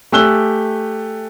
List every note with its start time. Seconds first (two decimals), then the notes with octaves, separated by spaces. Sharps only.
0.12 A3 G4 G#5 E6 F#6 G7